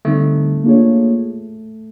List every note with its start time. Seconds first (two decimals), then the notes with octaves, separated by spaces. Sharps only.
0.05 D3 G3 A3 C4 D#4
0.64 A#3 D4 F4 G#4 C#5